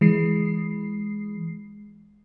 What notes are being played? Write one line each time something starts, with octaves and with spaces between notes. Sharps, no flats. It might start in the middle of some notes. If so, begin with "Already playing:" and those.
E3 G#3 C7